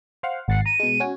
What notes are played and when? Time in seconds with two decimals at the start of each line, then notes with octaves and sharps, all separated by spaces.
0.23 C5 F5 F#5
0.48 G#1 F#5 A6 C7
0.66 A#5 D#7
0.80 B2 G#3
1.00 C#4 F#4 G#5